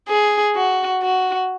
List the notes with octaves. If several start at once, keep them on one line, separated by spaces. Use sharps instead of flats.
G#4
F#4
F#4